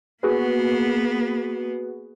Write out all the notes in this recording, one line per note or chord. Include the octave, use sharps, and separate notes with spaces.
A#3 B3 F#4 G#4 B4